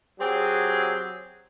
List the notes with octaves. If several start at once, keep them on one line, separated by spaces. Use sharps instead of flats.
F#3 C4 G4 G#4